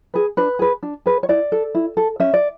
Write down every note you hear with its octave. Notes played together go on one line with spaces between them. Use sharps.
G#4 B4
D4 B4
G#4 B4
D4
G#4 B4
C#5
E4 D5
A4
E4
A4
C#4 E5
D5